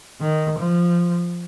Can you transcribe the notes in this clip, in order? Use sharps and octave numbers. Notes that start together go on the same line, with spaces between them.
D#3
F3